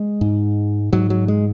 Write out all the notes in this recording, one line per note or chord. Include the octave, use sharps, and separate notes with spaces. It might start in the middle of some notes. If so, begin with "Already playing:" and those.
Already playing: G#3
G#2
G#2 F#3
F#3
G#3